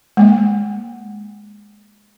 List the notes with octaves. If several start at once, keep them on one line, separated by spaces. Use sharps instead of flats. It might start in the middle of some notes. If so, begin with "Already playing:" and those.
G#3 A#3